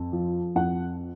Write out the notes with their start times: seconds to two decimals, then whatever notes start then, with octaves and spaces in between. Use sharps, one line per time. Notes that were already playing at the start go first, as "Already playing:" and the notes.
Already playing: F2
0.12 F3
0.56 F2 F#5